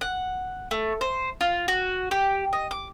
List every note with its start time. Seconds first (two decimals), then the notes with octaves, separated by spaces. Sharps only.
0.01 F#5
0.71 A3
1.01 C5
1.41 F4
1.68 F#4
2.11 G4
2.53 D#5
2.71 D6